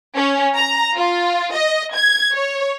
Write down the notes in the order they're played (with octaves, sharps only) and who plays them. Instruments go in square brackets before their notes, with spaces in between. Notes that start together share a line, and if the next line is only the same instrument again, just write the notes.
[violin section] C#4
A#5
F4
D#5
G#6
C#5